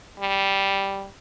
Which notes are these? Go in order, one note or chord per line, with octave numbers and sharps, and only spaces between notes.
G3